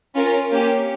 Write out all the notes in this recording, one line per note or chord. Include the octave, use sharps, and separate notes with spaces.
C#4 F4 A#4
A#3 C#4 G4